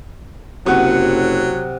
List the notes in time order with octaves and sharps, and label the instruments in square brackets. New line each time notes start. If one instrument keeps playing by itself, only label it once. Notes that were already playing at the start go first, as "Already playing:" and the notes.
[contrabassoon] F#1 [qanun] C3 C#5 [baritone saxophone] F#3 [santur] F#5 D#6